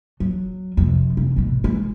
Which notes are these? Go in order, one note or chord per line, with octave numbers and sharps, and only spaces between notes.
F#3
F2 C3
F1
G#2 B2
G#3